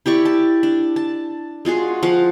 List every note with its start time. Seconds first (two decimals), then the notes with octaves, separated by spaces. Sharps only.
0.06 E4 G4 D5 C#6
0.25 A5
0.63 D4
0.96 A5
1.65 G#3 F4 F#4 G#4
2.03 F3 F5 F#5